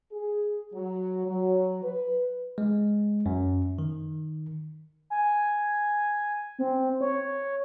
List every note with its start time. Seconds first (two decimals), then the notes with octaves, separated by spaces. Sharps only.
0.11 G#4
0.73 F#3
1.26 F#3
1.83 B4
2.58 G#3
3.26 F#2
3.79 D#3
5.10 G#5
6.59 C4
7.01 C#5